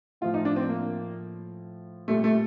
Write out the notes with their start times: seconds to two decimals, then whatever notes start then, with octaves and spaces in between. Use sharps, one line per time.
0.21 A2 F4
0.24 F3
0.34 D#4
0.45 D4
0.56 C4
0.69 A#3
2.08 A#2 G3 A3
2.24 A3